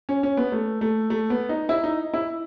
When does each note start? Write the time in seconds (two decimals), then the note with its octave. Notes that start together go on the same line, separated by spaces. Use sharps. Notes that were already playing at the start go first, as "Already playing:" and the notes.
0.09 C#4
0.23 C#4
0.37 B3
0.52 A3
0.81 A3
1.10 A3
1.30 B3
1.49 D#4
1.69 E4
1.84 D#4
2.14 E4